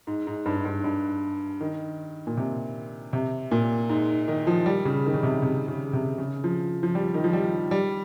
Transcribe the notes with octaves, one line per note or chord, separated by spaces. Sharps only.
G#2
G#2
G2
G#2
G2
G2
D#3
A#2
C3
C3
A#2
G#2
D#3
F3
G3
C#3
D#3
C#3
C3
C3
C#3
C3
C#3
F3
F3
G3
D#3
F3
G3
G3